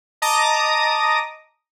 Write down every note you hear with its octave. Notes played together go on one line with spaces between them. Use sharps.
D#5 A5 A#5 D6 D#6 A#6